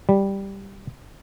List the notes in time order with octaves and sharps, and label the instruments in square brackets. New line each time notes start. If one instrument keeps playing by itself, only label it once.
[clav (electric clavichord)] G3